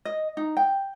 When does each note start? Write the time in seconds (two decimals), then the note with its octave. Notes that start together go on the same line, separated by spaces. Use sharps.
0.05 D#5
0.37 D#4
0.57 G5